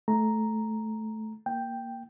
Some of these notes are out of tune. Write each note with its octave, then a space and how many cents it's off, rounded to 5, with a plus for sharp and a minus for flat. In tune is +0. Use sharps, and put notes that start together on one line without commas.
A3 -15 A#5 +0
A#3 +0 G5 +0